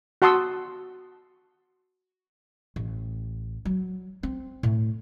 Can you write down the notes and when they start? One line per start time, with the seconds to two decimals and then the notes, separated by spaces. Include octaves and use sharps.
0.22 F#4 F#5 A5 C6 D#6 E6
2.76 A1
3.65 F#3
4.23 C4
4.63 A2